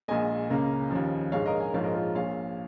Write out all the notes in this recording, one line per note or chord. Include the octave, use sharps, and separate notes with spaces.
A#1 A#2 G#3 D#5 G#5
C#2 C#3 A#3
D#2 C#3 F3
A#1 G#2 G#3 C#5 F5
A#4 D#5
D#5 G#5
A#1 G#2 F3 G#3 C#5 F5
A#4 D#5
F4 A#4
A#1 A#2 F3 C#5 F5